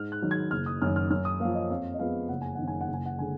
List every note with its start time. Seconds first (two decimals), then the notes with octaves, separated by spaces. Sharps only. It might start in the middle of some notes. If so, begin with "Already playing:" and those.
Already playing: G#2 F6
0.12 F#6
0.22 D#3 F#3
0.31 G#6
0.51 F#1 F6
0.66 D#6
0.82 F#2 D#3 F6
0.96 F6
1.10 F#2 F6
1.25 D#6
1.40 F3 A#3 F5
1.55 D#5
1.70 F2 F5
1.94 D#5
1.99 F3 G#3 B3 F5
2.29 F#1 F#5
2.41 G#5
2.55 D#3 F#5
2.64 F#2 G#5
2.81 F#5
2.88 F#1
2.94 G#5
3.06 F#5
3.19 D3 G#3 G#5